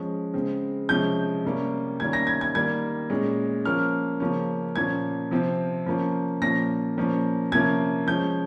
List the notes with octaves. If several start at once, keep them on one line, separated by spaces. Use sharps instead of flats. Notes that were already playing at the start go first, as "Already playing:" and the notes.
Already playing: F3 G#3 C#4
C#3 G#3 C4
C3 F3 G#3 C#4 G6
C3 G3 A#3 C#4
D#3 G3 A#3 C#4 G#6
A#6
G#6
G#6
D#3 G3 A#3 G#6
A#2 G#3 C#4
F3 A#3 C#4 F6
C#3 F3 A#3 C#4
A#2 F3 A#3 C#4 G#6
C3 F3 C4
F3 A#3 C#4
A#2 F3 A#3 C#4 A#6
A#2 F3 A#3 C#4
C3 F3 A#3 C#4 G#6
F3 G#3 C#4 G6